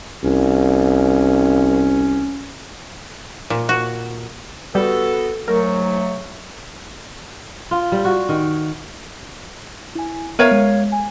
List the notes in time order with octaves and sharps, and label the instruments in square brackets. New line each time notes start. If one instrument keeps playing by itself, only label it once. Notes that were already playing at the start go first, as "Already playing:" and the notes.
[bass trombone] C2 [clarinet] C#4
[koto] A#2
F#4
[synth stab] G3 [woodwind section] B3 F#4 A4
[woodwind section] G#2 F#3 A3 [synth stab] A#4
[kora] F4
G3
F#4
D#3
[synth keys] E4 G#5
[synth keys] B3 E5 D#7 [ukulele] A#4 C#5 F5
[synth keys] G#3
G#5